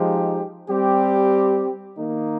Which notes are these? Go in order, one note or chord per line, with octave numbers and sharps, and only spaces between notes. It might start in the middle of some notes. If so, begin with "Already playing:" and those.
Already playing: F3 G#3 D#4 G4
G3 C4 G4
D#3 A#3 D#4